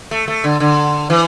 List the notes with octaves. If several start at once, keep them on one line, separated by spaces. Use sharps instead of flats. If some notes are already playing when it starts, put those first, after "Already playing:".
A3
A3
D3
D3
E3